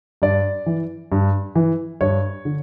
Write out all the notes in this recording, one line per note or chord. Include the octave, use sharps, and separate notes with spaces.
G2 D5
E3
G2
E3
G2 C#5
D3